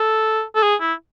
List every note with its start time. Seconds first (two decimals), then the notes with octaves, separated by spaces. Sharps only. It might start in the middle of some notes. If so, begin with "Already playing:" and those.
Already playing: A4
0.55 A4
0.63 G#4
0.81 E4